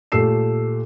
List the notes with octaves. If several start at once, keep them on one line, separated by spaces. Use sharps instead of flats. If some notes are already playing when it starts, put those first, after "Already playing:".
A#2 A3 G4 E6 C7 E7